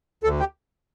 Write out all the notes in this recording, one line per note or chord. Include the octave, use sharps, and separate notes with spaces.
D2 A4
G4